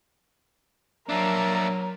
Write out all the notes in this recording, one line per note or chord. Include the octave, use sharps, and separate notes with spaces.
F#3 A#3 D4 A#4 E5 A5 A#5